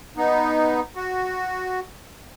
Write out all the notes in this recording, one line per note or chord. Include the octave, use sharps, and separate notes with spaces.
B3 D#4
F#4